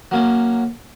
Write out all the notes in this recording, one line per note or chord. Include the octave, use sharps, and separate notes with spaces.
F#3 A#3 C#4